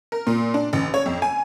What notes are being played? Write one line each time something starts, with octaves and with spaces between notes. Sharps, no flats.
A#4
A#2
D4
A1
C#5
F2
G#5